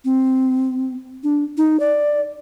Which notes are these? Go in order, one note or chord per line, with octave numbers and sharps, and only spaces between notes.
C4
D4
D#4
D5